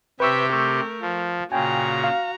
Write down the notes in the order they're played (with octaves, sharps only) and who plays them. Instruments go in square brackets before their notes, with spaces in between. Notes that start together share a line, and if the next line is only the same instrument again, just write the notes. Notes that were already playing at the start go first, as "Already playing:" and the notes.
[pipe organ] C3 G4 [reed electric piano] B4 C#6 E6 [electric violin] E5 G5
[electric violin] A3 A#4 [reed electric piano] C#6 E6 G6
[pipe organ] F3
[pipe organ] A#2 C#3 [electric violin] F#4 A#5 [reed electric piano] G5 G#5
[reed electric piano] F5